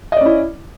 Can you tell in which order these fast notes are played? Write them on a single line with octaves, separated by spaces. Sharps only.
D#5 D5 C#4 E4